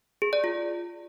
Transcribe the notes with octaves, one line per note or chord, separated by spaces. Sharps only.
G#4
D5
F4